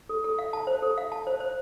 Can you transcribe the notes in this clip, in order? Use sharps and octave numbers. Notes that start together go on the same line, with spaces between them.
A4
A4
F5
A5
C5
A4
F5
A5
C5
C5